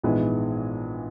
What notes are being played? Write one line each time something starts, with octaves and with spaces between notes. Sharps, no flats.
A#1 G#2 E3 G#3 B3